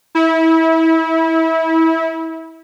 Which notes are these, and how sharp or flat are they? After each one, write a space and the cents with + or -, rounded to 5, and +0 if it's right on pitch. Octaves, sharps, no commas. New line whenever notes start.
E4 -25